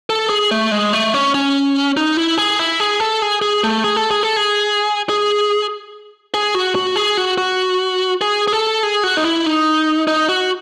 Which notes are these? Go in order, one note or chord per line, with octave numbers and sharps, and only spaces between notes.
A4
G#4
A3
G#3
A3
C#4
C#4
D#4
E4
G#4
E4
G#4
A4
G#4
G#4
A3
G#4
A4
G#4
A4
G#4
G#4
G#4
F#4
F#4
G#4
F#4
F#4
G#4
G#4
A4
G#4
F#4
D#4
E4
D#4
D#4
F#4